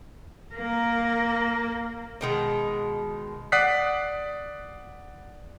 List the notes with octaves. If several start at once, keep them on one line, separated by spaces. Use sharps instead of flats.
A#3 A#4
B2 D#3 G#3
D5 F#5 D#6 F#6 B6 C7